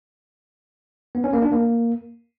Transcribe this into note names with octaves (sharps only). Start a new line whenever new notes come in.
B3
C#4
A#3
D4
A#3